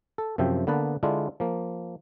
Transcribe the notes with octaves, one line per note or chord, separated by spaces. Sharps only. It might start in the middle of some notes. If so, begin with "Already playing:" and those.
A4
F#2 C3 F3 E5 G5
D3 A#3 B3 B4 A5
D3 G#3 D4 E4 F4
F3 A#3